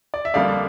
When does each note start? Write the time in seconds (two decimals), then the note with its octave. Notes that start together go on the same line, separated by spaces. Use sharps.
0.14 D5
0.25 E5
0.34 F2 D3 G3 A#3 D5 F5